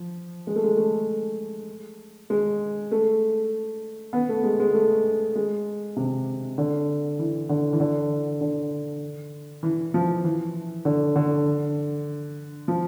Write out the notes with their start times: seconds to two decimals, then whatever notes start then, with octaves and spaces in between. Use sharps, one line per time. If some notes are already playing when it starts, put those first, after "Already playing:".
Already playing: F3
0.47 G#3
0.56 A3
0.64 G#3
0.78 A3
2.30 G#3
2.92 A3
4.13 B3
4.29 A3
4.43 G#3
4.60 G#3
4.74 A3
5.35 G#3
5.96 C3
6.58 D3
7.19 E3
7.49 D3
7.73 E3
7.80 D3
8.41 D3
9.63 E3
9.94 F3
10.24 E3
10.85 D3
11.16 D3
12.68 F3